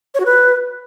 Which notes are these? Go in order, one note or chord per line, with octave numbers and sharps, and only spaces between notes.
C#5
F#4
B4